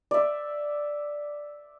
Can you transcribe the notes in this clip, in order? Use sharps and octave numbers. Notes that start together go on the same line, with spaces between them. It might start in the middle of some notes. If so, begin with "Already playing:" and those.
D5 E5